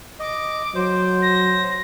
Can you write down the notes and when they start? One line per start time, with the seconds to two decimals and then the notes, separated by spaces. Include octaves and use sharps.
0.19 D#5 D6
0.75 F#3 C5
1.22 A#6